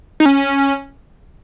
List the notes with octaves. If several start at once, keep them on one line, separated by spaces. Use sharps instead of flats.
D#4
C#4